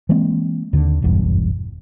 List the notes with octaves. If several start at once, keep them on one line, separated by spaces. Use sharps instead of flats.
E3 G#3 A#3 C4
D#2 D3
F#1 B1 E2 G2